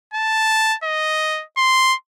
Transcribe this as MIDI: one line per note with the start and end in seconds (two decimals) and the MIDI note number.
0.14 0.75 81
0.83 1.43 75
1.57 1.94 84